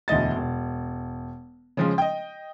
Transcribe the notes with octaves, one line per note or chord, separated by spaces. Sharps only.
E1 D2 E3 D#5 A6
E1
C#3 F3 G#3
D#5 G5